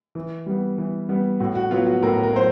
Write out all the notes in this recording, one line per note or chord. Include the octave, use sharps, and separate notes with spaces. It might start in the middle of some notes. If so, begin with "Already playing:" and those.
E3
G3 B3
E3
G3 B3
A2 F#4
F#4
F#3 B3 F4
F#4
A2 A#4
A#4
F#3 C5